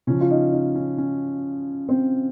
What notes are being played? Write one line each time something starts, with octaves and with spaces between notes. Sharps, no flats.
C#3 F3 C#4
F4
D#4
D#4
C#4
C#4
C4